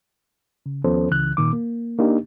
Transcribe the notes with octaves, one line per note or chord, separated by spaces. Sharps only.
C#3
D#2 F3 B3 C#4 A4 C5
C#2 C#3 E3 F#6
A#2 D#3 D6
A#3
A#3 D4 D#4 G4